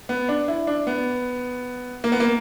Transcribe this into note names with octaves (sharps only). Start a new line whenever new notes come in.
B3
D4
E4
D4
B3
A#3
B3
A#3